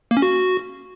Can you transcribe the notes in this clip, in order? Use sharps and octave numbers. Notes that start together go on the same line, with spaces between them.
A#3
C#4
F#4